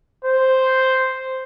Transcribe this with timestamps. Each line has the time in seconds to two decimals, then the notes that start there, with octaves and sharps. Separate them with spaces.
0.25 C5